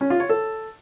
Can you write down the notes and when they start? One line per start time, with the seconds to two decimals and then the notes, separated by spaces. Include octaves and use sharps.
0.01 C#4
0.10 F4
0.20 C#5
0.29 A4